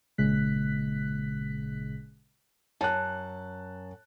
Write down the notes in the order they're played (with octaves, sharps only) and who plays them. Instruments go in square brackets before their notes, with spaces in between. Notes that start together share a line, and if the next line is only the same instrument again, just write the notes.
[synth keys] G#1 A#2 C#3 G#3 F#6 B6
[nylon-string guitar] F#2 [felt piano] A5 F#6